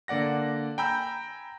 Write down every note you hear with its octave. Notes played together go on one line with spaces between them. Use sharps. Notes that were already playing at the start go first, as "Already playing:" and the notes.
D3 A#3 D5 F#5 A#6
G5 G#5 A#5 B5 E6 G6